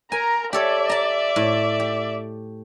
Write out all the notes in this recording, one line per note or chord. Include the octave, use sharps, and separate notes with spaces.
A#4 G#5 A#5
G4 A4 C#5 D5 E5
A5 A#5
A2
G4